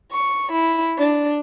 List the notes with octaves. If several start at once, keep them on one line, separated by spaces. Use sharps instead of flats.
C#6
E4
D4